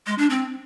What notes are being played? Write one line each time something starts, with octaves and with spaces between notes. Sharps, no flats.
G#3
D4
C4